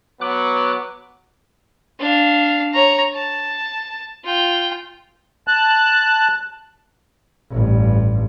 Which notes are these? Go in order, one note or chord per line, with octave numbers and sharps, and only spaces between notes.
F#3 B3 D6 F#6
D4 F5
C#5 A#5
A5
F4 G5
A5 F#6
A1 G2